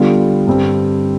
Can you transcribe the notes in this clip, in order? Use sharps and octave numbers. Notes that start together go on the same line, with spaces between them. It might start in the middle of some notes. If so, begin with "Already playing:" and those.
Already playing: D3 G3 B3 F4 A4
G2 D3 G3 C4